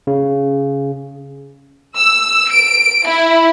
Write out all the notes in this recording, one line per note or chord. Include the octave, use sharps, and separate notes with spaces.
C#3
E6
D7
E4